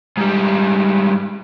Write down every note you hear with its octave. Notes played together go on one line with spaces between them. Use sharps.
G#2 G3